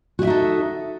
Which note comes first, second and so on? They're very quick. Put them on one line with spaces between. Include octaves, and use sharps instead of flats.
F#4 E4 E5 D#4 A4